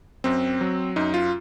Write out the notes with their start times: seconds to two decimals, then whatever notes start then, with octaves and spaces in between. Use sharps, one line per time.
0.24 F#2 C4
0.61 F#3
0.96 F#2 D#4
1.14 F4